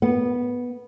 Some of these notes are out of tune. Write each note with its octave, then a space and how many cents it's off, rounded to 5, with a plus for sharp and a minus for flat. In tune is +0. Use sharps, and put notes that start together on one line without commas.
B3 -10